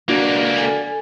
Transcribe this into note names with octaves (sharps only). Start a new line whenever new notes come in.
C#2 A#3 D4 F#4
A4 G#5